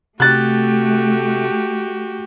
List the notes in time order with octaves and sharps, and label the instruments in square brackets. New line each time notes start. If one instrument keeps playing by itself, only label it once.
[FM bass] C3 [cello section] A3 [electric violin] F#4 G4 [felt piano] F#6 A6